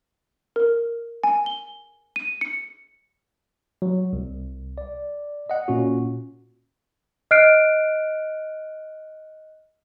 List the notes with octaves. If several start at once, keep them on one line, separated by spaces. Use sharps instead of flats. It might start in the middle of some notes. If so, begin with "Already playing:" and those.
A#4
G#5
G7
D#7
C#7
F#3
C2
D5
D#5 F#5
A#2 C#4 F#4
D#5 F6 F#6 C7 D7